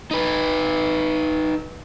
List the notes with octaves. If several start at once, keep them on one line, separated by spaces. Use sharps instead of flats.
D#4 B4